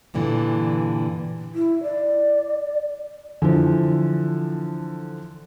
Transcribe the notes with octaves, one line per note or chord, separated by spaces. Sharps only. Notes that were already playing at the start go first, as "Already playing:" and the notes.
G2 A#2 D3 E3
E4
D5
D3 E3 F3